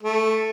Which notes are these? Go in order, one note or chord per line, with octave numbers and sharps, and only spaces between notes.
A3